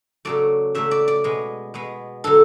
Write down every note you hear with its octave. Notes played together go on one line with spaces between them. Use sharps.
C#3 F#3 A3 D5
C#3 F#3 A3 E5
D5
D5
B2 G#3 B3
B2 G#3 B3
D3 F#3 A4